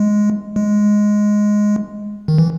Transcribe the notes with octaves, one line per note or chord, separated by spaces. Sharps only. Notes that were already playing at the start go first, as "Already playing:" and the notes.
Already playing: G#3
G#3
D#3
E3